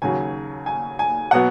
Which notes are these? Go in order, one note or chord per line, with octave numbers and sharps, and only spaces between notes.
D#2 C#3 F#3 G#5
G#5
G#5
B2 F#3 B3 F#5